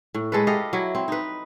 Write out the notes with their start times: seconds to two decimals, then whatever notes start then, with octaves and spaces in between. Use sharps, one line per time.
0.14 A2
0.32 G#3 A4 B4
0.47 G4 A4 D#5 F5
0.73 F#3 E4
0.95 C4
1.08 D#4 B4